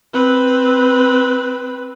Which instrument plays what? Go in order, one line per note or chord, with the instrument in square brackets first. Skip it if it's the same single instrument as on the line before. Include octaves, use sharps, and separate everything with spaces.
[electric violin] C4 B4